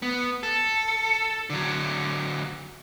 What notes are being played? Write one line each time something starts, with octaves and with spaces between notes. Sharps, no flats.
B3
A4
D3 F#3